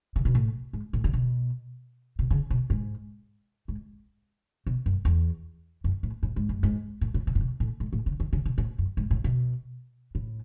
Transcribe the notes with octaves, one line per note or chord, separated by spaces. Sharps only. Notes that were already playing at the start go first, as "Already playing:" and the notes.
C#3
B2
A2
G#2
A2
C#3
B2
B2
C#3
B2
G#2
G#2
B2
F#2
E2
F#2
A2
A2
G#2
F#2
G#2
A2
A2
B2
A2
B2
A2
G#2
A2
C#3
D#3
C#3
B2
A2
F#2
G#2
A2
B2
A2